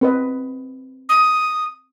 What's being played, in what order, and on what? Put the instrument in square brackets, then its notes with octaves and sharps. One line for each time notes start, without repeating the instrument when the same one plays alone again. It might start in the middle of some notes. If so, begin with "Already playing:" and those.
[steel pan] C4 B4 D#5
[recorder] D#6